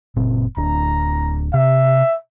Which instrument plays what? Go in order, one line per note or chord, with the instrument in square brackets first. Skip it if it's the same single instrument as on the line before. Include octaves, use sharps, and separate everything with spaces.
[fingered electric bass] F#1 A#2 C4
[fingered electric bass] D1 D4 [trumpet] A#5
[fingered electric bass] C3 [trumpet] E5